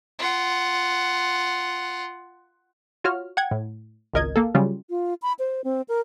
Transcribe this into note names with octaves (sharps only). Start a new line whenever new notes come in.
F4 F#5
F4 F#4 C#5 F6
F#5 G5 G#6
A2
G#1 C#2 A#4 D#5 G#6
A#3 A4
C#3 F#3 G3 C#4 F4
F4
B5
C5
C4
A#4